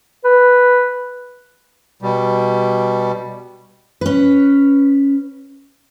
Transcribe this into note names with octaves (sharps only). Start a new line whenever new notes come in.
B4
B2 G3
C#4 B4